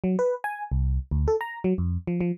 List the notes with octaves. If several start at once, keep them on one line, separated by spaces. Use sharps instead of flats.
F#3
B4
G#5
C2
D2
A4
A#5
F#3
F2
F3
F3